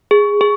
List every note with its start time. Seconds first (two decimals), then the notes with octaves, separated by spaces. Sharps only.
0.11 G#4
0.41 G#4